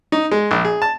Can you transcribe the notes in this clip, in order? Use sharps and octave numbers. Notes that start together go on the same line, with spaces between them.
D#4
G#3
A#1
G#4
A5